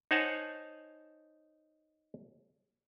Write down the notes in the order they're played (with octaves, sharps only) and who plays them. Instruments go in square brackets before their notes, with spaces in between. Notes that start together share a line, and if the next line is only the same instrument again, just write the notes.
[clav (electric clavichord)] D#4 C5 C#5 F#5 G#5 A5